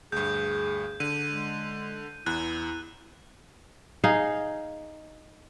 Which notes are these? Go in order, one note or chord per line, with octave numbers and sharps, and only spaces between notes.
D2 G2 G#4 G6
D3 D#7
G#3
E2 E4 F#6
D#4 G#4 F5